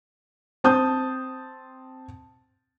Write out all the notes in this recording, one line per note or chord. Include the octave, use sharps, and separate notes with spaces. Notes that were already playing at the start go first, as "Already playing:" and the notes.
C4 A5 D#6 G6